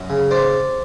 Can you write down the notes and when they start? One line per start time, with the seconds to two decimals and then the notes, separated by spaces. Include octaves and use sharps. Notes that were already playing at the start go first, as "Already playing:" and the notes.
Already playing: F#2
0.10 C#3
0.31 C5 D5